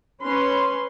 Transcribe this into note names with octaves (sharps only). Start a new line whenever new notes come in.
C#4 B4 C6